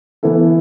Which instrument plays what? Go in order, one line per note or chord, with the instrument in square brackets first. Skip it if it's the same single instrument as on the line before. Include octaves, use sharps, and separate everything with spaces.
[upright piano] E3 B3 E4 A4